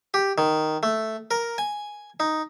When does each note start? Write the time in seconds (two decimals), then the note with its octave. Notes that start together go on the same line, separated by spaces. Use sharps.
0.14 G4
0.38 D#3
0.83 A3
1.31 A#4
1.58 G#5
2.20 D#4